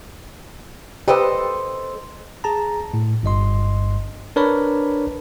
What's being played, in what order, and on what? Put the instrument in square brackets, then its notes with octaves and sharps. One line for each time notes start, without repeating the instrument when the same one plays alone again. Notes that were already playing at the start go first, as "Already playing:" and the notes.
[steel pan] G4 B4 [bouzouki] A4 C5 D#5
[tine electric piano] G#4 A5 A#5
A2
G1 G2 D#5 C6
D4 A#4 B4 C#5 D5 B5